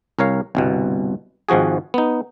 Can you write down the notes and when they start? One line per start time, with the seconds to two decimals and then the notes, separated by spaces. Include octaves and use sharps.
0.19 C2 A#4 C#5 F5
0.55 G1 C2 B2
1.49 G#1 G#2 F3 F#4 G#4
1.94 B3 D#4